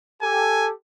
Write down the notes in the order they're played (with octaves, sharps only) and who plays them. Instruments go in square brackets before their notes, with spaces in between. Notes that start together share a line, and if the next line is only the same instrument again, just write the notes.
[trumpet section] G4 A4 [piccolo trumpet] G#5